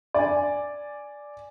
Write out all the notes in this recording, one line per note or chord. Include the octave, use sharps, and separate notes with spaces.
D5 G#5